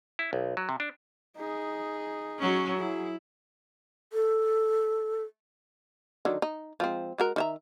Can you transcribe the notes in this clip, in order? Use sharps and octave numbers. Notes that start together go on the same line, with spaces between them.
E4
B1
F#3
C3
D4
D#4 G#4
F#3 C#4
F#3 E4 G#4
A4
D3 D#3 F#3
D#4
F3 G#3 C4
G#3 F#4 A#4
D#3 E5 A#5